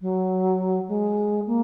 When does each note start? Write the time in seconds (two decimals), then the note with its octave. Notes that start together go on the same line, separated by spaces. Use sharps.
0.01 F#3
0.88 G#3
1.47 A#3